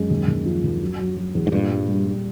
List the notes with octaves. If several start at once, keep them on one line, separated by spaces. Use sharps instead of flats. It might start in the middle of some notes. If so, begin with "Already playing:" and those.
Already playing: F#2 G#3
D#2
D#2
F3
D#2
F#3
F#3
F#3
E2
G#2
G2 A#2
G3
G3
G3